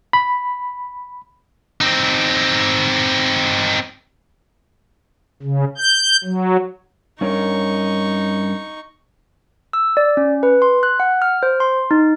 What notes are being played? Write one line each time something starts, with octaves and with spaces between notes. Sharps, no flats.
B5
C4 D#4
C#3
G6
F#3
G2 C#4 D#4 A#4 C#6
E6
D5
C#4
B4
C6
F#6
F#5
F6
C5
C6
D#4